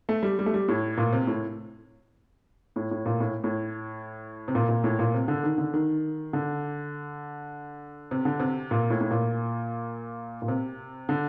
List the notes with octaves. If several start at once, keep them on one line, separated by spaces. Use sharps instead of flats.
A3
G3
G3
A3
G3
A2
A#2
C3
A2
A2
A2
A#2
A2
A2
C3
A#2
A#2
A2
A#2
C3
D3
D#3
D3
D#3
D3
C3
D3
C3
A#2
A2
A2
A#2
A#2
C3
D3